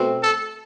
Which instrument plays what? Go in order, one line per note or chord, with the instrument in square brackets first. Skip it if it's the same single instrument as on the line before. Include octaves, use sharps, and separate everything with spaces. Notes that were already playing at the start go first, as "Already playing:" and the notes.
Already playing: [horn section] B2 A3 C4
A4